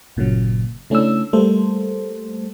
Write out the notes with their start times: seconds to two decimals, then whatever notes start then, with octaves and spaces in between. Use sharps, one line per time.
0.16 G1 A#2 C#3 F#3
0.90 C#3 A3 C#4 D4 E4 E6
1.33 G3 A3 A#3 A4 C5